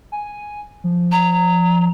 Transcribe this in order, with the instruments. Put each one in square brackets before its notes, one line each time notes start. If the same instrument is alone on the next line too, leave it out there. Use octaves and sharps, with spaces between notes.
[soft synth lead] G#5
F3
[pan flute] A#5